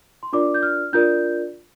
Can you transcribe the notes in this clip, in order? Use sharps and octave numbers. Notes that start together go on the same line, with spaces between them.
C6
D4 F4 A#4 D5 D6
G6
F6
D4 F4 A#4 D5 G6